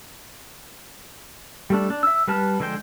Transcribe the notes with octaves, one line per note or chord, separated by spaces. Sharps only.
G3 A3 D4
D4
E5 E6
G3 B4 A5 F6
D3 F3 G#3 C5 G5